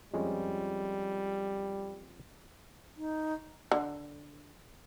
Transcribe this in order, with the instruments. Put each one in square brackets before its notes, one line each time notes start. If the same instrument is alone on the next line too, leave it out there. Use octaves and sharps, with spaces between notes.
[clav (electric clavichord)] F2 G#3 C#4 [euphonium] G3
[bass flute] D#4
[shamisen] D3